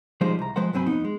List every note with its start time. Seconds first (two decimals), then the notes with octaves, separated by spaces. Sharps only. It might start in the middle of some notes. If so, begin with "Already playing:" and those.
0.21 F3 G3 G#3 D#4 C5
0.39 C2 A#5
0.56 F3 G#3 B4 C5 F#5
0.73 C2 G2 F#3 C4 G#5 B5
0.86 F2 B3 D#4
1.05 G#3